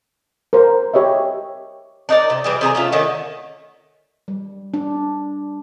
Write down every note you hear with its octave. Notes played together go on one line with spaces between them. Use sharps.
A#4 C5
G4 C#5 D#5 E5
D4 D#4 A#4 D5
C3
E3 G3 G#4
C3 G#4 A#4 A#5
A3 C#4 F4
D3 D#3 A3 C#4
G3
D4